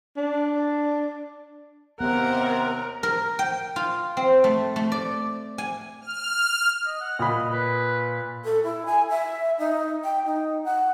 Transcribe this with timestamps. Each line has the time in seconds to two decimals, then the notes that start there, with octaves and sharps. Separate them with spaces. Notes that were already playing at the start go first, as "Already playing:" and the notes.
0.17 D4
2.00 D#2 C3 B3 A#4 F#5 A#5
3.03 A#4
3.39 G5
3.76 F4
4.17 C4
4.44 A3
4.76 A3
4.92 D5
5.58 G#5
6.01 F6
6.86 D#5
7.00 F#5
7.19 A#2 D#5 B5
7.52 B4
8.45 A4
8.64 E4
8.86 G#5
9.10 E5
9.59 D#4
10.04 G5
10.25 D#4
10.64 F#5